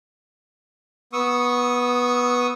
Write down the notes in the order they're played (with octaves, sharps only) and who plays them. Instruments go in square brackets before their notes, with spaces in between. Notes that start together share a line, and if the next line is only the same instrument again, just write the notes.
[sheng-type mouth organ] B3 C#6 D#6 E6